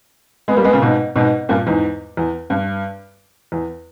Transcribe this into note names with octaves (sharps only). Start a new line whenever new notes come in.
G#3 B3
G3 A#3
G#3 B3
A#2 C#3
G#2 B2
G#2 B2
G2 A#2
E2 G#2
E2
G2
E2